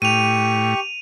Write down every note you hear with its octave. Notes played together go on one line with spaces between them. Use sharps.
A2 G4 C#6 D#7 F7